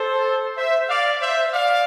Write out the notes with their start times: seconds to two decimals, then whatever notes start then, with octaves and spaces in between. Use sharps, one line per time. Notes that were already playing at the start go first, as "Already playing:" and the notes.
Already playing: A4 C5
0.57 C5 E5
0.89 D5 F5
1.21 C5 E5
1.53 D5 F5